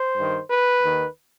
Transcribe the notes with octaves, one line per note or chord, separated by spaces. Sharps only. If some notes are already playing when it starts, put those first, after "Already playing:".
Already playing: C5
G2
D#3
B4
D#2 D#3